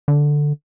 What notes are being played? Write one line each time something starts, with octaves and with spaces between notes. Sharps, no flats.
D3